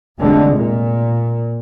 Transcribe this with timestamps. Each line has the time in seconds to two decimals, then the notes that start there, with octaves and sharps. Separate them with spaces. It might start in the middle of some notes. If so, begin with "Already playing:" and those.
0.20 F1 D3 G#3
0.55 A#2